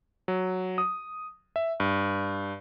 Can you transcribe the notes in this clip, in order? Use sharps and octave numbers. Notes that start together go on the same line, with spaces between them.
F#3
D#6
E5
G2